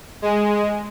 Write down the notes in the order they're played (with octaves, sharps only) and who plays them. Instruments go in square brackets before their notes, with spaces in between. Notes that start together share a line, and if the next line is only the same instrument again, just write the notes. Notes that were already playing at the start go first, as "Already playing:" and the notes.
[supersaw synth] G#3